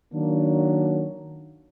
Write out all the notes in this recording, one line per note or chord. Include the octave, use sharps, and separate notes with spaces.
D#3 F#3 A#3 D4